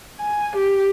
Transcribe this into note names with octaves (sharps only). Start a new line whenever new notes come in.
G#5
G4